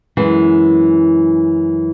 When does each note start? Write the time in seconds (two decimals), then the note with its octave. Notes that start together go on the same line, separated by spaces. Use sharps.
0.17 F#2 E3 G#3